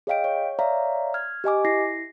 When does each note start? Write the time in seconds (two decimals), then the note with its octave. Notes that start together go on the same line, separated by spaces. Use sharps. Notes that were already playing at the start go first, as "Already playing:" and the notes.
0.07 G#4 C#5 D#5 F5 G5 D7
0.24 C#5
0.59 C#5 D5 E5 F5 A#5
1.14 F6 G#6
1.44 G4 D#5 G#5 D6
1.65 E4 A#6 C7